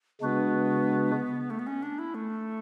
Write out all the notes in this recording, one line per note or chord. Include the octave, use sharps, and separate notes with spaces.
C#3 G#3 B3 D4 F#4 B4
A3
B3
C#4
D4
E4
A3